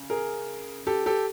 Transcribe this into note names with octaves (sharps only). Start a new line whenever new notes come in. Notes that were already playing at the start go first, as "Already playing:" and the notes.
Already playing: C#3
G#4 A#4
G4 A4
G4 A4